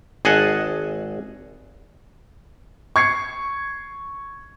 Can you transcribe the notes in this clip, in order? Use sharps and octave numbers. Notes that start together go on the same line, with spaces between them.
G#1 G#4 D#5 F#5 G#5 A5
C#6 G#6 C7 C#7